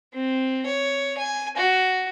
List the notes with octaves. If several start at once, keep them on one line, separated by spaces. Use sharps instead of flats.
C4
C#5
G#5
F#4